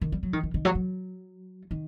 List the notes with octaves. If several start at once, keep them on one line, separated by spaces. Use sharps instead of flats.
D#3
G3
F#3
D#3
D#3
D#3
F#3
F#3
D#3